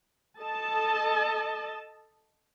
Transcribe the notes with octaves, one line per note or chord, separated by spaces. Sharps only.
A4 D#5 A5